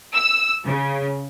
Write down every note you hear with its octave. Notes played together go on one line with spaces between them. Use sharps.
E6
C#3